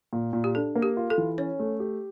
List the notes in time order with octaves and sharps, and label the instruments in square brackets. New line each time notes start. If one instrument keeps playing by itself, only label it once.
[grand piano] A#2
A#2
[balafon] G4
[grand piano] D4 [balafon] A4
[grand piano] A#3
[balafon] G4
[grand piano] F4
[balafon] A4
[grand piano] E3
[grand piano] C#4 [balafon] C#5
[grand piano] A3
G4